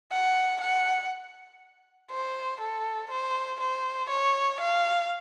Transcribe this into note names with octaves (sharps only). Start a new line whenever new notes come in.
F#5
F#5
C5
A4
C5
C5
C#5
F5